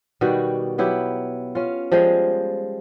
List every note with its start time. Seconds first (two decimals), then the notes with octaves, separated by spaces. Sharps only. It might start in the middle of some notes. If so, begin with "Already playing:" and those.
0.21 B2 D#3 G3 F#4
0.78 F#3 B3 E4 G4
1.55 C#4 F4
1.92 F3 G3 G#3 F5